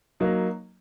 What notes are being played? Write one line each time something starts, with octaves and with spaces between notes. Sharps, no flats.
F#3 A#3 D#4